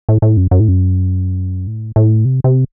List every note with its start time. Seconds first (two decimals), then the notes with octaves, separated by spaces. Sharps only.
0.09 A2
0.22 A2
0.37 F#2
0.51 F#2
0.60 A2
0.68 F#2
1.67 A2
1.96 A2
2.25 C3
2.44 C3